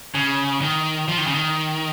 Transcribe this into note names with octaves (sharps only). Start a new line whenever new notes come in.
C#3
D#3
F3
D#3
C#3
D#3